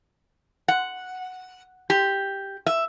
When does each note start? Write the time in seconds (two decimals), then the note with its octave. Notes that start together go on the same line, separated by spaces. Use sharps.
0.68 F#5
1.90 G4
2.66 E5